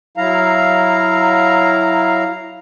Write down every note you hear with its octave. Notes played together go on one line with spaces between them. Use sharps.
F#3 E4 F5 A#5